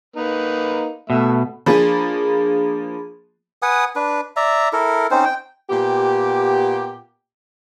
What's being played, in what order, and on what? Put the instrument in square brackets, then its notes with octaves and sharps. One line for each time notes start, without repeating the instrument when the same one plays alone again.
[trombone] A#3 [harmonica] D#4 B4
[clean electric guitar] B2 [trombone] A3 [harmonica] E5
[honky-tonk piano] F3 A#3 [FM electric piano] D4 G#4 B5
[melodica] B4 F#5 G#5 D#6
D4 B4
D5 E5 A#5
E4 A4 A#4
C4 C#4 D#4 C5
G5
[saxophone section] A#2 B3 G4